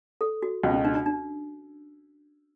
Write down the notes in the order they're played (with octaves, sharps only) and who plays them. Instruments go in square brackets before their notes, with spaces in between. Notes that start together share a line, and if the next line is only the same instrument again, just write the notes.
[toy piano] A4
F#4
[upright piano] C#2 B2 G#3 [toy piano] F#4
[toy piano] C#4
D4
D4
D4